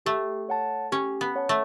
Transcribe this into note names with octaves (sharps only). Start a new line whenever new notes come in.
A3 G4
C#5 F#5 A5
C#4 G4
B3
C#5 F#5 A5
A3